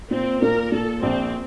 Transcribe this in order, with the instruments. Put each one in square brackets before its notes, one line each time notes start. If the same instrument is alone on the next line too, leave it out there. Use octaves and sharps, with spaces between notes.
[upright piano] A#2 [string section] C4
[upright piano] A#2 [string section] A#4
[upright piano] A#2 [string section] A4
[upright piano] A#1 [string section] C4